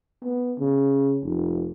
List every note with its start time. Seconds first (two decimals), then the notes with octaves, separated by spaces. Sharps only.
0.24 B3
0.59 C#3
1.23 F1